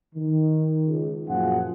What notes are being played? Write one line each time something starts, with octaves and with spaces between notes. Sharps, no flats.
D#3
C#2
F#2 A#2 F3 F4 G#4 F#5